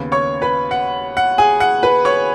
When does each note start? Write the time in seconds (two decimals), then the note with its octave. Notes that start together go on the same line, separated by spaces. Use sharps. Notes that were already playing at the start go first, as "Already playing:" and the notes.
Already playing: D#2 C#3 B3
0.12 C#5 C#6
0.42 B4 B5
0.71 F#5
1.17 F#5
1.38 G#4 G#5
1.60 F#5
1.83 B4 B5
2.05 C#5 C#6